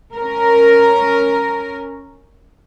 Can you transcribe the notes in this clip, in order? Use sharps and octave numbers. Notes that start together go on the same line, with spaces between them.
C#4 A#4